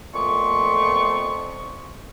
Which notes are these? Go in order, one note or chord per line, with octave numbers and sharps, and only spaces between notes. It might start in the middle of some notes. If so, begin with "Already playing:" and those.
F2 A#2 A3 B3 C6 C#6